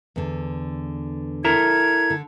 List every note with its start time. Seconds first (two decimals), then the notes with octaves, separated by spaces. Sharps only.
0.16 E2 D3
1.45 E4 A4 A#4 G#6
2.10 D3